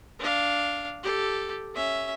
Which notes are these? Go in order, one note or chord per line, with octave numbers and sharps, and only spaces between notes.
D4 F5
G4 A4
C#4 E5